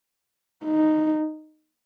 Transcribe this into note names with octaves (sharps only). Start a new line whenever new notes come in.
D#4